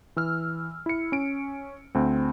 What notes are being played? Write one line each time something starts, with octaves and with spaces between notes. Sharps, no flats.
E3 E6 F6
E4 C#7
C#4 D7
D2 C4